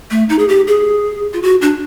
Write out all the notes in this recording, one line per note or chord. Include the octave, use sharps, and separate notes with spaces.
A3
D#4
G#4
G4
G#4
F4
F#4
D4